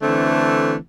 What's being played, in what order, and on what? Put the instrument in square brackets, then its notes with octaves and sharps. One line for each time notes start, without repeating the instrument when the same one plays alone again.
[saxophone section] D3 E3 A3 C4